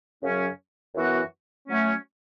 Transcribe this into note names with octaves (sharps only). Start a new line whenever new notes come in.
F#2 C#3 F#3 C#4
F#2 E3 B3 F#4
F#3 A3 C#4